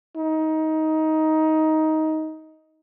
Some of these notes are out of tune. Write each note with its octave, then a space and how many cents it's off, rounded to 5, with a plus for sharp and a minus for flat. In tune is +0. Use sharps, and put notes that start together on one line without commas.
D#4 +15